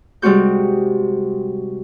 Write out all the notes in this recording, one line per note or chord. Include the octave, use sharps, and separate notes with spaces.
C3 G3 G#3 C4 F#4 G6